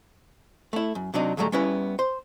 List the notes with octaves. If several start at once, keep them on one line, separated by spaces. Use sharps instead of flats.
A3 E4
F#2
C3 F#3 D4 D#4
D2 G#2 F#3 G3 A3 A#5
G3 B3 C#4 E4 B4
C5